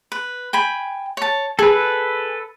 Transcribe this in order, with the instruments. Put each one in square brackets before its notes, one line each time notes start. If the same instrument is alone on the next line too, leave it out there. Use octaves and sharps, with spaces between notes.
[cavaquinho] B4
G5 G#5 B5
C#5 A5
[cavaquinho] G#4 [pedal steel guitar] A4 B4